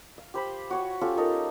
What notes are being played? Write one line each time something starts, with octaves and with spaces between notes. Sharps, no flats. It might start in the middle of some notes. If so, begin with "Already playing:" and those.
F5
G4 C5 B5
F#4 C#5 F#5
C#4 F4 G4 A4
D#4 A4 A#4